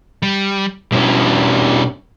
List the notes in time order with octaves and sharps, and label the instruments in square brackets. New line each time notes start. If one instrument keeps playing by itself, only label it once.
[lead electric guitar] G3
[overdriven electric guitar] G2 C#4 [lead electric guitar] B2 E4